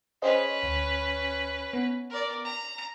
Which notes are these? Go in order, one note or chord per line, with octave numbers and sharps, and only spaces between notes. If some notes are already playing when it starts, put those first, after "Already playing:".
C#4 G#4 B4 C5 D#5
D2
B3
A#4 D5
A#5